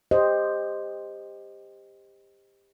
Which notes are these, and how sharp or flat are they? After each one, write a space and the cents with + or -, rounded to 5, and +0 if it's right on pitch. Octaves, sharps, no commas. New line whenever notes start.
G4 +20 C5 +0 D#5 +0